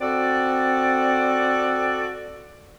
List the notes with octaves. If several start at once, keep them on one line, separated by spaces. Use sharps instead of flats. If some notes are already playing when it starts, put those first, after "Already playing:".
C4 F#4 A4 D5